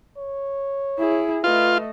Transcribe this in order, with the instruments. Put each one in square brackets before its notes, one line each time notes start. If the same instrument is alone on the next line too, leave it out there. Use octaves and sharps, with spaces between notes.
[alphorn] C#5
[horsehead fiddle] E4 G#4
[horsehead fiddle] A3 D#5 [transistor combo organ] F4 [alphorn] B4